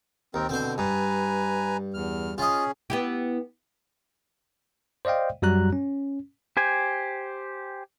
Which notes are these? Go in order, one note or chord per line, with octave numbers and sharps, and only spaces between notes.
D#2 C4 A#4
B2 D3 C4 C5
G2 B4 G#5 A#5
E2 F6
C#4 F4 G#4 D#5
B3 E4 G4
C5 D5 D#5 F5 G5
F#2 F#3 G3 F#4 A#5 F#6
C#4
G4 C5 G#5